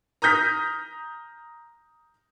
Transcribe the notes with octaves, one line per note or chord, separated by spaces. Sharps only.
A#5 D#6 F6 G6 A#6 B6